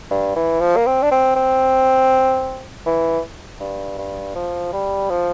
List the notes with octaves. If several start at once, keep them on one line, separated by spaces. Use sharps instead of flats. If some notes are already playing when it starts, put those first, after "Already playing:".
G2
E3
F3
A#3
C4
D4
C4
C4
E3
G2
G2
F3
G3
F3